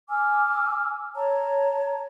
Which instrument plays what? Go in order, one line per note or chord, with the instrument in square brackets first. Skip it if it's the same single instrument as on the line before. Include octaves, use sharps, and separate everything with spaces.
[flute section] G#5 D6 E6 F6
C#5 A5 A#5